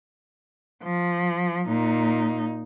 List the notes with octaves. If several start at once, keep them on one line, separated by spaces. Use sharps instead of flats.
F3
A#2 D#4